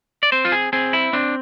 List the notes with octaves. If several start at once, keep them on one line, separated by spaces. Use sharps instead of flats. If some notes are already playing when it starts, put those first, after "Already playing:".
D5
C4 C5
F4
G#4
C4 G#4
E4
C4 D4